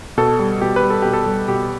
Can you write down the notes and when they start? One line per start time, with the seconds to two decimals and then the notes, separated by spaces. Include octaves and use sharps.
0.17 B2 A4
0.39 G3
0.61 B2 G4
0.76 B4
0.83 G3
0.90 A4
1.02 B2 G4
1.13 A4
1.26 G3
1.48 B2 G4